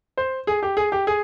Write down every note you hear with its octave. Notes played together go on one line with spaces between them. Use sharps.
C5
G#4
G4
G#4
G4
G#4